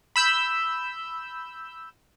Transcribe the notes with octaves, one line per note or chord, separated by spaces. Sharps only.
B5 E6 G6